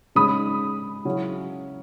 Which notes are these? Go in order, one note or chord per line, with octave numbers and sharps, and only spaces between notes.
C#3 G#3 D#4 B5 D#6
C#3 F#3 C#4 E4